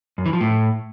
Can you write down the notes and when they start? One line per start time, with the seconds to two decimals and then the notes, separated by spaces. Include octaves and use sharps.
0.18 F#2
0.26 E3
0.33 F3
0.41 A2